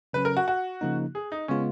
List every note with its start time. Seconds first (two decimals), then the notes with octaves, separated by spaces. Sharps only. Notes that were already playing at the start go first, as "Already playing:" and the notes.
0.13 C#3 F#3 C#4 B4
0.25 A#4
0.37 F#4
0.48 F#4
0.81 C#3 F3 A#3 D#4
1.15 G#4
1.32 D#4
1.48 C#3 G#3 B3 C#4 F4